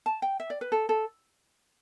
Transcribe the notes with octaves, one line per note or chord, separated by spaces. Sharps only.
A5
G5
E5
D5
B4
A4
A4